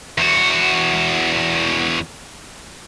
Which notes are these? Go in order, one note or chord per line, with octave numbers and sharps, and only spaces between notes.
E2 F#4